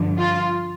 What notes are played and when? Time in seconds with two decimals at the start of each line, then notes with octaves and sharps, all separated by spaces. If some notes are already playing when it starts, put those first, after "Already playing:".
Already playing: G2 D3 F3
0.19 F4